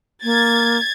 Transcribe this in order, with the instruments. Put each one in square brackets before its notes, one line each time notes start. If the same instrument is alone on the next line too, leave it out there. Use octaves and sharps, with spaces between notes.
[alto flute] A#3 [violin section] G#6 A6